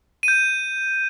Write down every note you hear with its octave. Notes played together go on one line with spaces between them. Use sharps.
D#7
G6
D#7